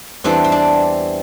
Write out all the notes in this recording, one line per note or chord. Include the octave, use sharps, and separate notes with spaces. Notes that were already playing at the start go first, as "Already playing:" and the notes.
E2 E3 G3 C4 D4
C4
D4